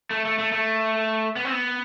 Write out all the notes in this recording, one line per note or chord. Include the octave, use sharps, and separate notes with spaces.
A3
A3
A3
A3
B3
C4
B3